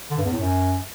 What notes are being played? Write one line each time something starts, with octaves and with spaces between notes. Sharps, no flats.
D3
G2
E2
A2
F#2